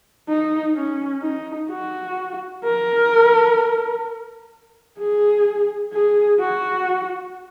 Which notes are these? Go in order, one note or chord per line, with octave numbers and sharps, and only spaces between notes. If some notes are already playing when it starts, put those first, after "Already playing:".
D#4
C#4
D#4
F#4
A#4
G#4
G#4
F#4